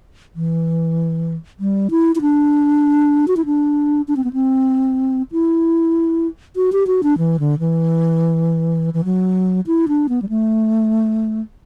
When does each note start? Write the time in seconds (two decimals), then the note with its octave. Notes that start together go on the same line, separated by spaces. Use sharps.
0.35 E3
1.60 G3
1.91 E4
2.15 E4
2.21 D4
3.28 F#4
3.37 E4
3.46 D4
4.08 D4
4.16 C4
4.24 B3
4.33 C4
5.32 E4
6.56 F#4
6.72 G4
6.87 F#4
7.03 D4
7.18 E3
7.40 D3
7.59 E3
8.94 E3
9.05 F#3
9.67 E4
9.88 D4
10.09 B3
10.22 G3
10.29 A3